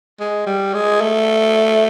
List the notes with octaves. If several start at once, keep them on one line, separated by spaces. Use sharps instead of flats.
G#3
G3
G#3
A3